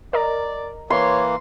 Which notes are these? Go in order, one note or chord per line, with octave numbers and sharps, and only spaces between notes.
A#4 D5 D#5 A#5
E3 A#3 C#5 C6